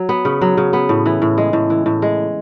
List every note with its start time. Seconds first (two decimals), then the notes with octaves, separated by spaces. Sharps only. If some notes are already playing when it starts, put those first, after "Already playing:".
Already playing: F#3
0.09 B3
0.25 C#3
0.41 F#3
0.57 C#3
0.73 B3
0.89 A2
1.06 E3
1.22 A2
1.38 G#3
1.53 A2
1.70 E3
1.86 A2
2.02 G#3